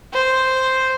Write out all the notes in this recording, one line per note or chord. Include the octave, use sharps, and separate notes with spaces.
C5